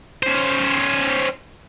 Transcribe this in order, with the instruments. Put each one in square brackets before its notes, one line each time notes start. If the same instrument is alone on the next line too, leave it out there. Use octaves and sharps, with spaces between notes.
[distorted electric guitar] C#4 C5